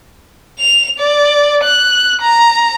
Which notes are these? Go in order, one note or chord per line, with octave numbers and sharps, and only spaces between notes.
F7
D5
F#6
A#5